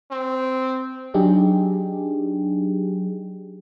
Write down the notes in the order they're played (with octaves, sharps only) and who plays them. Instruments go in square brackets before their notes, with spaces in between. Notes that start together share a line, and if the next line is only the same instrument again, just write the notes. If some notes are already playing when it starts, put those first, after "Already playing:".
[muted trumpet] C4
[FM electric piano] F#3 D4 D#4 G4 G#4